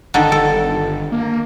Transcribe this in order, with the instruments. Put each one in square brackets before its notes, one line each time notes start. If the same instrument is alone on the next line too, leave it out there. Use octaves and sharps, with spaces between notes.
[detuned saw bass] G1 [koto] D3 D#3 A4
[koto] A4
[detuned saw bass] A#3